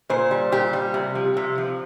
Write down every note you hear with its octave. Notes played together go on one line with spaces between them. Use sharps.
A#2 C5
G3
A#2 G4
G3
C3
F3
C3
F3